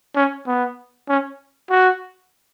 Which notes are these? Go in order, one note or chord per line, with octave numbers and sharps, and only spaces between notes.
C#4
B3
C#4
F#4